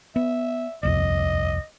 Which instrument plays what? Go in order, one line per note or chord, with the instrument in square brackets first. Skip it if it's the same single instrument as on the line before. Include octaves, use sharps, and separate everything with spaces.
[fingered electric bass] B3 [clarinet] E5
[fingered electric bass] D#1 C2 F2 [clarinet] D#5